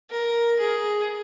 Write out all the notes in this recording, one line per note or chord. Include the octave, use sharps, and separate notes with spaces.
A#4
G#4